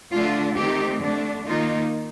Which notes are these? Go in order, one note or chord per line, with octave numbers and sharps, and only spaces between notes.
D3 A3 D4 F4
D#3 A3 C4 D#4 G4
D3 A3 D4
D#3 A#3 D#4 F4